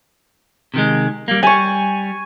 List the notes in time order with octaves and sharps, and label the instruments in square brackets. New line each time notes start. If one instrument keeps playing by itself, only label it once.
[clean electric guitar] C3 D#3 G#3
G3 A#3
[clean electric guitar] G3 [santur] G#5 C#6